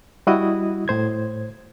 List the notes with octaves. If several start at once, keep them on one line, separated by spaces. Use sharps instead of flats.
G3 E4 F#4 D#5 D#6
A2 C5 G#6